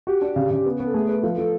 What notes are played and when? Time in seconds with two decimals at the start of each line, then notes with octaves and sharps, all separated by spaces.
0.07 F#4 G4
0.21 D4
0.36 C#3
0.51 C#3
0.66 B3
0.80 B3
0.86 A4
0.94 A3 G#4
1.09 B4
1.23 F3 A4
1.38 F3